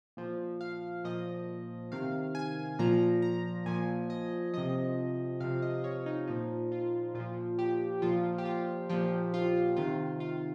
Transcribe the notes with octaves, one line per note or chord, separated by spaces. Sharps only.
A#2 F3
F5
A#2 F3 D#5
C3 D#3 F5
G#5
A#2 F3 A#5
A#5
A#2 F3 G#5
D#5
C3 F3 D#5
C3 F3 F5
D#5
C#5
D#4
A#2 F3 D#4
F4
A#2 F3 F4
G4
A#2 F3 F4
G4
F4
A#2 F3 G4
F4
C3 D#3 F4
F4